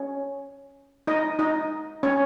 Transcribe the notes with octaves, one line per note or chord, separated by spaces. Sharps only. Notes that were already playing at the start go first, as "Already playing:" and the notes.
Already playing: C#4 C#5
D#4 D#5
D#4 D#5
C#4 C#5